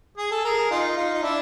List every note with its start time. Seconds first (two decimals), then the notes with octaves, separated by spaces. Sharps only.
0.18 G#4
0.31 A4
0.45 G#4 A#4
0.70 D#4 F4
0.97 D#4 F4
1.14 D#4
1.23 D4 E4